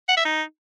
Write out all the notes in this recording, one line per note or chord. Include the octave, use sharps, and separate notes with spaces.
F#5
E5
D#4